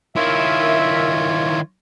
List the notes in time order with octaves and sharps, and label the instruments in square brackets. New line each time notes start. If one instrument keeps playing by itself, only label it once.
[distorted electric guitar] D#3 E4 [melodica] F4 C#5 [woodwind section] A#4 E5